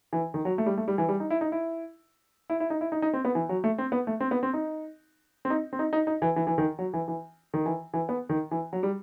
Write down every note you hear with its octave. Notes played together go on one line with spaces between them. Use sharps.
E3
D#3
F#3
A3
G3
A3
G3
E3
G3
D#4
E4
D#4
E4
E4
E4
D#4
E4
D#4
D#4
C4
B3
E3
F#3
A3
C4
B3
A3
C4
B3
C4
D#4
C4
D#4
C4
D#4
D#4
D#4
E3
E3
E3
D#3
F#3
E3
E3
D#3
E3
E3
B3
D#3
E3
F#3
G3